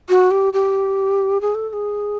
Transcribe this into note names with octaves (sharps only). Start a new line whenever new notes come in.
F#4
G4
G4
G#4
A4
A4
G#4